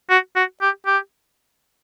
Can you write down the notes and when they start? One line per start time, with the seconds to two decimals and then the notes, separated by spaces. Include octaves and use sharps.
0.10 F#4
0.36 F#4
0.61 G4
0.86 G4